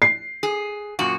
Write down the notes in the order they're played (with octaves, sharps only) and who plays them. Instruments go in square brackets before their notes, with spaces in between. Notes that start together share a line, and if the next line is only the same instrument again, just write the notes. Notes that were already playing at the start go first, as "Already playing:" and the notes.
[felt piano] C7
[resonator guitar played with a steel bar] G#4
F#2 A#2 F#4